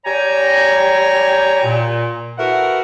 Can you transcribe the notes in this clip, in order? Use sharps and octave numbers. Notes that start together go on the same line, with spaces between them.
G3 G4 C#5 G5 G#5 A#5
A#2
A3 E4 F#4 A#4 B4 F#5